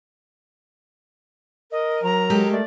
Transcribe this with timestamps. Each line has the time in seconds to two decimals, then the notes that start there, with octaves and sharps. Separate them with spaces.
1.71 A#4 D#5
2.03 F#3 A#5
2.30 G#3 G4 A4
2.51 A3 D5